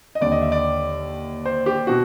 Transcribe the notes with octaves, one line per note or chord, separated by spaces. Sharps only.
D#5
D#2 D3 D5
D#5
E5
D5
C5
G4
B2 F#4